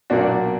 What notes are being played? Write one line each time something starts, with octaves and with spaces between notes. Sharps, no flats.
B1 A#2 A#3 D4 F#4